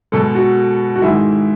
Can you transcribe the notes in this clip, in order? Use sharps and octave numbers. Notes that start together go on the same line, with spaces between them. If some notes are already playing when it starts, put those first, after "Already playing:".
B2 G#3 A4
F#4
F#4
G#2 D#3 G#3 E4